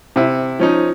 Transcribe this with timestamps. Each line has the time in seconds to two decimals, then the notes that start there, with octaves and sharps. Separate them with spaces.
0.16 C3 E4
0.60 F3 C#4 D#4